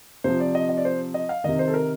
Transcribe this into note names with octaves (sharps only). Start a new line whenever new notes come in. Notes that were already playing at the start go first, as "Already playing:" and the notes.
C3 F3 C5
D5
D#5
D#5
D5
C5
D#5
F5
C3 D#3 D#5
C5
A4
A#4